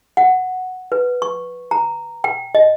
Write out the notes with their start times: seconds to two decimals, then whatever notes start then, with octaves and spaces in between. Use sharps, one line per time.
0.17 F#5
0.92 B4
1.22 C#6
1.71 A#5
2.24 G5
2.55 D#5